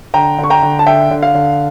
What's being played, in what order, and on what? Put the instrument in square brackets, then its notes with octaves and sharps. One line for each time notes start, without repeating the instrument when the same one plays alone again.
[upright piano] D3 G5 A#5
D3
C#6
G5 A#5
D3
A5
D3 E5 G5
D3
F5
D3